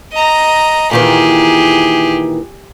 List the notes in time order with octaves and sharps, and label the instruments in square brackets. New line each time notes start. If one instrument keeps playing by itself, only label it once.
[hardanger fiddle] D#5 A#5
[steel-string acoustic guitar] A#2 D#3 E3 [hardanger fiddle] G4 G#4